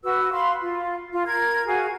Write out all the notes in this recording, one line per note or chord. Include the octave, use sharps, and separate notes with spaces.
F#4 B4 E6
F5 B5 C6
F4
F4
A#4 G#6
F#4 G#4 F5